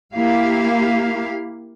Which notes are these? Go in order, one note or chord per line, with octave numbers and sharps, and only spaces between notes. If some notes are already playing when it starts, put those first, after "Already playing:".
A#3 E4 G4 F5